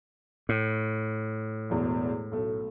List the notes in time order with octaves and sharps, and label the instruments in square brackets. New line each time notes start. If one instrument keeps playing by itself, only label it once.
[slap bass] A2
[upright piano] E1 E2 B2
B1 A3